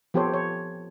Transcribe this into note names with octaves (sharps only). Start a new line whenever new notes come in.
F3 B3 G4 A4 C5 C#5
C#5